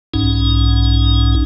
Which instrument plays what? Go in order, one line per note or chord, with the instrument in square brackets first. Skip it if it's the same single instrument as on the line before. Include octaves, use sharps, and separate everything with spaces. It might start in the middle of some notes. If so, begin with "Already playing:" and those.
[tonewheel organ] B1 G#2 C#4 D#4